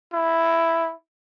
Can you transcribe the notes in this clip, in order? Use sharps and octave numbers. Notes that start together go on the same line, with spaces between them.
E4